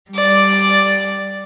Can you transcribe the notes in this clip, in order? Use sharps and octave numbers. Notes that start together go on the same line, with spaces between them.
G3 D5